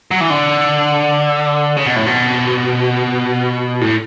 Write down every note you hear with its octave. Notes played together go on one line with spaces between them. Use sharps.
F#3
E3
D3
C#3
B2
A2
B2
A2